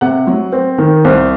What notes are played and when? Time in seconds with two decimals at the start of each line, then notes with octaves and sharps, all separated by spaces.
0.01 C3 F#5
0.27 F#3
0.52 C4
0.78 D#3
1.04 C2 C5